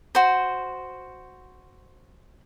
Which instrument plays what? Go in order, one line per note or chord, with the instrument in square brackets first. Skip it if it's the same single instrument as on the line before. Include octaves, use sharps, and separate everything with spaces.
[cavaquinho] F#4 C5